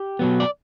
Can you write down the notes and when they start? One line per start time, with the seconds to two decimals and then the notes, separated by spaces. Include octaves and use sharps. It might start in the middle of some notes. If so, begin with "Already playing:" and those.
Already playing: G4
0.19 B2 F#3 B3
0.40 D5